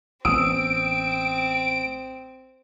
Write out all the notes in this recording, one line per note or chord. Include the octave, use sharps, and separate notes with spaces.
A1 B3 C4 D#6 E6 D7